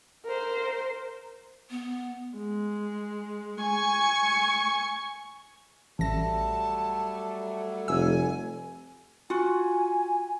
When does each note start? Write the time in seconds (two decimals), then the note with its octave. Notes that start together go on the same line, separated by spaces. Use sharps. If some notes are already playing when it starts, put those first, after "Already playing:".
0.25 A#4 C5
1.70 B3
2.37 G#3
3.61 G#5 C#6
5.99 A1 F#3 G3 A3 A5 A#6
7.88 F1 G#5 E6
9.30 F4 F#4 G#5